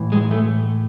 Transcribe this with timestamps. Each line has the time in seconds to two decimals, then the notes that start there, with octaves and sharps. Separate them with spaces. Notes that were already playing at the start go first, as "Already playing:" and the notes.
Already playing: A2 E3
0.12 G#3
0.31 A3